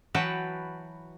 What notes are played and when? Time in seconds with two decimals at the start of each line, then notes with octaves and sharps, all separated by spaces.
0.14 E3 F#3 F#4 B4 G5 A5